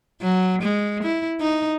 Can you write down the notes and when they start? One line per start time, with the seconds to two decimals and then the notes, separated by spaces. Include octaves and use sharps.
0.22 F#3
0.62 G#3
1.04 E4
1.41 D#4